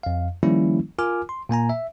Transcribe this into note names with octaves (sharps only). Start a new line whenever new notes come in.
F2 F5
D#3 F3 G3 A#3 C#4 E4
F4 A#4 G#5 D6 F6
C6
A#2 A#3 G#5 A#5
E5